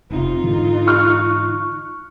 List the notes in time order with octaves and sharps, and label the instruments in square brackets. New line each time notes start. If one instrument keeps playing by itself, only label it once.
[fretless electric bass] F1 C3 [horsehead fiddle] D#4 F4
[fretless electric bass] G#2 D3 E3
[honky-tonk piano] C#6 F6 F#6